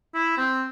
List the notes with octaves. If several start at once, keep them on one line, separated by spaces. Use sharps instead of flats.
E4
C4